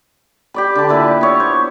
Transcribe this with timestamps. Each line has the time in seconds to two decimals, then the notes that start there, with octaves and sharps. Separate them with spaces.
0.54 G4 D5 B5
0.75 D3 A5
0.89 A#2 E4 B4 D5
1.21 B3 C#5
1.40 C5